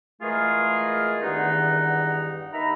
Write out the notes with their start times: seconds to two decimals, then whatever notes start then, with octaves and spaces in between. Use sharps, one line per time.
0.21 E3 G#3 A3 F4 G#4 A#4
1.21 E2 G2 D#3 D#4 F#5
2.52 D#2 D#4 E5 A#5 B5